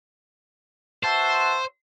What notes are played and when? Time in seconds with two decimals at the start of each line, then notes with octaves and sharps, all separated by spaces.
1.04 F#4 B4 C5 E5 A5